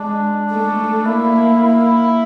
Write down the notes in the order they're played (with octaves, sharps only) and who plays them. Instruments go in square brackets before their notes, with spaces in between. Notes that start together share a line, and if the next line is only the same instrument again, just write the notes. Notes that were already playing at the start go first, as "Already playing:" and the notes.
Already playing: [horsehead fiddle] G#3 [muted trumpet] D4
[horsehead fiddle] A3
[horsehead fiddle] A#3 [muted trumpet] E4
[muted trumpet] E4